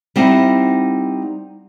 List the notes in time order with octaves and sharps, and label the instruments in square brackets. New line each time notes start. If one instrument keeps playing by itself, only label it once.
[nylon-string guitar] G3 C4 D#4 E4 F#5